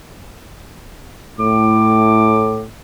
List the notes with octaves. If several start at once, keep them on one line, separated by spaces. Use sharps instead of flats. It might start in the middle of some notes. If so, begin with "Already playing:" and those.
A2 D6